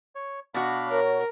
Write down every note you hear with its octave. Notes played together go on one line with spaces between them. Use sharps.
C#5
B2 D4 F#4 F5 B5
A#4 C#5